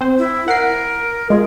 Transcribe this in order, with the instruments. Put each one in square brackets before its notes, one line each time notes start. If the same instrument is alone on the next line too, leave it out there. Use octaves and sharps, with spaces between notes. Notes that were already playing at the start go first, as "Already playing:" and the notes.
[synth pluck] C4 C5
[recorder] E4
[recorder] A#4 [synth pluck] F#5 C7
[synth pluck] G#3 F4 [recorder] G#4